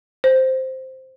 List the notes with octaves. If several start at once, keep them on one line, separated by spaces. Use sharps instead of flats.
C5